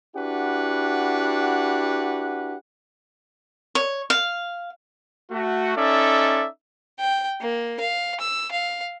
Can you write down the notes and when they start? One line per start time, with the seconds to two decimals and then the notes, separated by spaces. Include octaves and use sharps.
0.15 D4 E4 F#4 G4 B4 F#5
3.75 C#5
4.10 F5
5.31 A3 F#4
5.76 C#4 D#4 A4 D5 E5
6.99 G5
7.41 A#3
7.80 F5
8.20 E6
8.52 F5